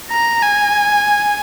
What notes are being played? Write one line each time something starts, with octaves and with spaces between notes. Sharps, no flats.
A#5
G#5